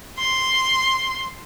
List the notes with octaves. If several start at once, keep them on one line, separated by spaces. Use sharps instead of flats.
C6